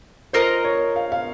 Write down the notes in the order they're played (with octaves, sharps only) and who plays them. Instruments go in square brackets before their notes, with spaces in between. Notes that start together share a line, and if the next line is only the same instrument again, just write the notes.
[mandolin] F4 A#4 D#5 [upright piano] C5
[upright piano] C#5
F5
F5